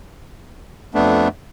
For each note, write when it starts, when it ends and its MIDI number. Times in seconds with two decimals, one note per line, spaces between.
0.94 1.28 41
0.94 1.28 57
0.94 1.28 59
0.94 1.28 62